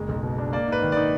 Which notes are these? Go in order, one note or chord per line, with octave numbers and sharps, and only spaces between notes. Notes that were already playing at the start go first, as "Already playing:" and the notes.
Already playing: F#1 G#3
B1
B2
D4
A#3 D5
G#2 B4
D#3
D#4 D5